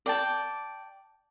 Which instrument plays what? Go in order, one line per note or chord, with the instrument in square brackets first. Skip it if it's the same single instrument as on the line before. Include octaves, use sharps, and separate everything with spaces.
[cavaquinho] D5 G5 A5